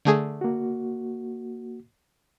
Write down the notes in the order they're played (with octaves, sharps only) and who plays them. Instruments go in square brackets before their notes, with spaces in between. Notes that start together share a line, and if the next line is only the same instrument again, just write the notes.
[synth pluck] D3 A3 G#4
[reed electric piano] A#3 F#4